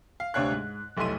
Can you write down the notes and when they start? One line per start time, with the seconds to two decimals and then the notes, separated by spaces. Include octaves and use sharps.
0.20 F5
0.34 D2 C3 D4 C#5 F5 F#6
0.52 G#2
0.97 F1 B1 A3 E4 C6 D#7